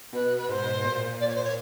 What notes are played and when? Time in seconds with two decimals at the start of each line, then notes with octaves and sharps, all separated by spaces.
0.13 B2 B4
0.37 B4
0.49 G#2 C5
0.84 A#2
1.20 D5
1.27 C#5
1.35 C5
1.44 C#5